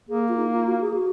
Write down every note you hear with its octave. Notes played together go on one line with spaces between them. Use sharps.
A#3 G#4
F4
D#4
F4
F#4
G#4
F#4